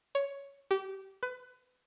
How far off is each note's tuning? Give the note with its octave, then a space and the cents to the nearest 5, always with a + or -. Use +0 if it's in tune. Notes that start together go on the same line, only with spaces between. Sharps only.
C#5 +10
G4 -25
B4 +25